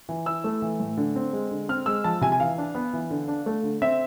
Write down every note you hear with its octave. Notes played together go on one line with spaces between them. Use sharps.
E3
E4 E6
A3
E3
A2
D3
C4
G#3
D3
C4 F6
G#3 E6
F3 A5
C3 G#5
G#5
E3 F5
D4
B3
E3
D3
D4
A3
D3
C4 E5